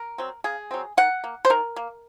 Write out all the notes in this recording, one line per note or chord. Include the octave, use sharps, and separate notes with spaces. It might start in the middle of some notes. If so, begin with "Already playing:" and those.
Already playing: A#4
F#3 C4
C#3 G#4
F#3 C4
D#3 F#5
A#3
C5
D#3 A#4
A#3